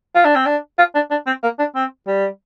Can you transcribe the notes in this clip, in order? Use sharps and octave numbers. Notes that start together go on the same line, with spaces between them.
F4
D4
C4
D4
F4
D4
D4
C4
A#3
D4
C4
G3